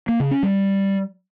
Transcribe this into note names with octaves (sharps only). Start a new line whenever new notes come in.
A#3
C#3
C#4
G3